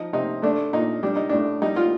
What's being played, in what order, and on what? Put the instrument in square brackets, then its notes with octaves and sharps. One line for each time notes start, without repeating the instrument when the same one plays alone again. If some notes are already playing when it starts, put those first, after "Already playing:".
Already playing: [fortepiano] F3 D#4
C3 D#4
A3 D4
A#2 D#4
G3 D4
D#4
A2 D4
G3 D#4
F4